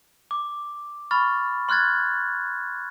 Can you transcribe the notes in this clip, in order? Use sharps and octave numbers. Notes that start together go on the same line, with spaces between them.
D6
B5 C#6 F6 A6
C6 F6 F#6 G#6 A6